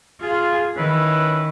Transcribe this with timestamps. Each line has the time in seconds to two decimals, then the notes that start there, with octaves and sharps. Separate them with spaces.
0.21 F4 G#4
0.76 D#3 C#4 E4 B4